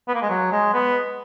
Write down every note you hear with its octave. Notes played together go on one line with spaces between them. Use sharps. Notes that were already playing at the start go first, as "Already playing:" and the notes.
B3
A#3
G#3
F#3
G#3
B3